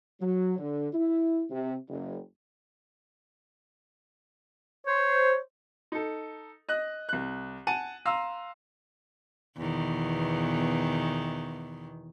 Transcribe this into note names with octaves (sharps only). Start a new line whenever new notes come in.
F#3
D3
E4
C3
F#1
C5 C#5
D#4 A4
D#5 F#6
C2 F#6
F#5 G#5 A5 D#7
F5 A#5 C6 E6
E2 B2 D#3